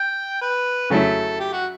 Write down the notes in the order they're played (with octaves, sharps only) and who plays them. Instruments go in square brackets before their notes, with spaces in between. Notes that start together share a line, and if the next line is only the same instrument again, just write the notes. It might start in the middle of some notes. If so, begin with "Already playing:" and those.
Already playing: [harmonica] G5
B4
[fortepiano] C#3 F#3 A3 E4 [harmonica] A4
[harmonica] G4
F#4